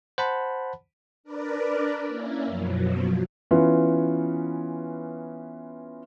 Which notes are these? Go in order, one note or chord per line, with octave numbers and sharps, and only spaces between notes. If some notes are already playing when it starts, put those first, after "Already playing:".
C5 F#5 A5 B5
D4 A#4 B4 D5
A#3 C#4 E4
F#2 B2 F3 F#3
E3 B3 C#4 F4